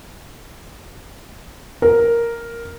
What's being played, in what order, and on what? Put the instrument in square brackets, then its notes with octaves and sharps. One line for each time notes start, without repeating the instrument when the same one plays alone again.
[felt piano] A#4